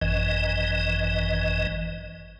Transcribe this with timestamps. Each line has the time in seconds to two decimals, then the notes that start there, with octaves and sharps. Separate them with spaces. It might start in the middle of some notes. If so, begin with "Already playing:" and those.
0.01 G#1 F#2 E3 D#5